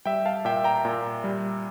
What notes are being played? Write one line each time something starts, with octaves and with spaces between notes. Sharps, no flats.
G3 E5 G5
F5 A5
A#2 E5 G5
G5 A#5
A#2
G3